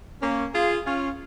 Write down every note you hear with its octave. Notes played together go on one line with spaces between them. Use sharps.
A#3 C#4
F4 G#4
C#4 F4